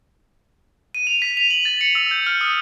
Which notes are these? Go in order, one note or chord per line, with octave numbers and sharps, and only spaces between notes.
D#7
F7
B6
F7
F#7
A6
C#7
E6
G6
F6
D#6